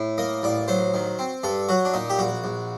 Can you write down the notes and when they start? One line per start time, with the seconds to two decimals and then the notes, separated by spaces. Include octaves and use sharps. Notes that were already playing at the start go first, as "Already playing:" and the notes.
Already playing: A2
0.18 A#3 D#5
0.43 A1 D5
0.68 F#3 C5
0.94 D#3
1.19 C4
1.43 G2 A4
1.69 F#3 F#4
1.85 D4
1.94 A#2 D#4
2.10 G4
2.19 A#1 F#4
2.44 A#1